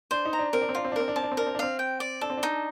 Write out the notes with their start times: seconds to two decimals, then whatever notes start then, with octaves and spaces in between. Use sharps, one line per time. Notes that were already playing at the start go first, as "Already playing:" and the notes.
0.11 D4 C5
0.25 D#4
0.33 A#5
0.39 D4
0.53 C4 A#4
0.62 D4
0.69 C4
0.75 D4 F4
0.85 C4
0.92 D4
0.96 C4 A#4
1.08 D4
1.16 C4 A5
1.23 D4
1.32 C4
1.37 D4 A#4
1.47 C4
1.55 D4
1.59 C4 F5
1.79 G5
2.00 D5
2.21 D4 A4
2.30 C4
2.37 D4
2.43 D#4